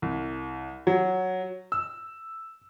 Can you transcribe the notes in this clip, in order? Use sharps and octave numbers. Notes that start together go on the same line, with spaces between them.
C2
F#3
E6